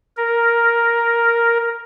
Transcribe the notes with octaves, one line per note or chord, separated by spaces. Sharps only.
A#4